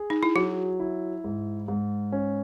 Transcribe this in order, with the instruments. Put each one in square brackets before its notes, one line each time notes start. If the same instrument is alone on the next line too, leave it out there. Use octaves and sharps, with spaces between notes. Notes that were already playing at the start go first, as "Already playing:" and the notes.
Already playing: [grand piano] G#4
[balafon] D#4
E4
[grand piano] F#3 [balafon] F#4
[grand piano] E4
G#2
G#2
C#4